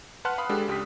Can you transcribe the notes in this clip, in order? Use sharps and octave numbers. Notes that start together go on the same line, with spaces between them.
B4 F#5 A5 C6 F6 F#6
F5 B5 D#6
G#3 D4 G4 A4
C#2 G4 D#6 B6